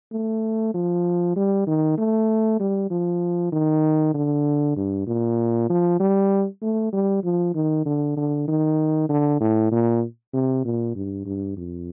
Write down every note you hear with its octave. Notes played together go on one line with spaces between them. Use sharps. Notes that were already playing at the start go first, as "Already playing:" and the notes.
A3
F3
G3
D#3
A3
G3
F3
D#3
D3
G2
A#2
F3
G3
A3
G3
F3
D#3
D3
D3
D#3
D3
A2
A#2
C3
A#2
G2
G2
F2